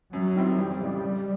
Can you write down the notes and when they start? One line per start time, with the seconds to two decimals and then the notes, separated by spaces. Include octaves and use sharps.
0.13 F#2 F#3
0.35 D#3 G3 C4 E4
0.57 F2 G3
0.81 C#3 E3 G#3
1.02 F2